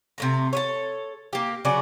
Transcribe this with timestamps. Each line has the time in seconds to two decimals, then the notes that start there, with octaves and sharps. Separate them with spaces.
0.18 C3 A3 A#5
0.53 A4 B4 C#5
1.33 A#3 G4
1.65 C#3 F#3 F#4 D5